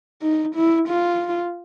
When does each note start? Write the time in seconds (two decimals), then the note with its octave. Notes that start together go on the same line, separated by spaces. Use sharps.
0.22 D#4
0.55 E4
0.88 F4